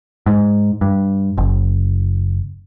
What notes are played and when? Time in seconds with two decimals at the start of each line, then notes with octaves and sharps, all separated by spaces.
0.26 G#2
0.81 G2
1.38 F#1